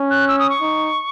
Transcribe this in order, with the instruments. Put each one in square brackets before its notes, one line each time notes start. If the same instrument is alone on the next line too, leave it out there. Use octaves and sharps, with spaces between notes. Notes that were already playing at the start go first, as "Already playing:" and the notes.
Already playing: [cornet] C#4
[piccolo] F#6
E6
D#6
C#6
[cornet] D#4